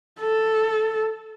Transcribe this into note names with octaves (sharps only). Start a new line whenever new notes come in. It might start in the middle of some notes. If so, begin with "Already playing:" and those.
A4